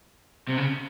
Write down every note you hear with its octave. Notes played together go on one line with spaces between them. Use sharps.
C3
C#3